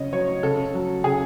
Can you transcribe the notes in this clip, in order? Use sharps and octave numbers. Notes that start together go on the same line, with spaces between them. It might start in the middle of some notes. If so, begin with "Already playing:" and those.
Already playing: C#3 F#3 C#5 D#5
F#3 C#5
C#3 A4
F#3
C#3 G#4